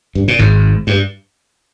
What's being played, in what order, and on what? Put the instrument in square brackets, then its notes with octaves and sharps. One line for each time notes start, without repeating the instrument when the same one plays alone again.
[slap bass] G2
A#2
G#1 G#2
G2